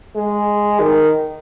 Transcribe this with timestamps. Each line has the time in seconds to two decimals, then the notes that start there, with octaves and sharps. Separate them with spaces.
0.16 G#3
0.80 D#3